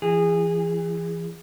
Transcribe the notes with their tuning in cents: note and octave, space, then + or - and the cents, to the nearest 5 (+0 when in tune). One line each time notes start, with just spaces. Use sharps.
E3 +35 G#4 -20